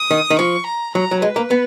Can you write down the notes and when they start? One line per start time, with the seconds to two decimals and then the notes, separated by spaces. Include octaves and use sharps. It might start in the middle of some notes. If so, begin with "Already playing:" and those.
Already playing: D#6
0.11 D#3
0.30 D#3
0.39 F3 C#6
0.67 A#5
0.95 F#3 A#5
1.11 F#3
1.22 G#3 B4
1.36 A#3
1.51 B3